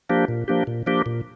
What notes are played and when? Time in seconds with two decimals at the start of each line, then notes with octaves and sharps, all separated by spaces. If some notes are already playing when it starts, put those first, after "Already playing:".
0.09 F3 A#3 D4 G4
0.28 A#2
0.48 F3 A#3 D4 G4
0.67 A#2
0.86 F3 A#3 D4 G4
1.06 A#2